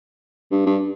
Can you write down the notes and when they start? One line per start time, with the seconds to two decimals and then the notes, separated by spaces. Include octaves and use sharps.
0.52 G2
0.66 G2